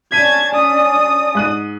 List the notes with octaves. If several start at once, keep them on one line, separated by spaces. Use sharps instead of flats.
C#4 D4 D5 A5 G#6 B6 D#7
D#6
G#2 F#6 D#7